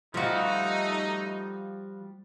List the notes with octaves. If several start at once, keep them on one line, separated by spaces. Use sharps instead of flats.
F3 G3 A3 D#4 F4 F#4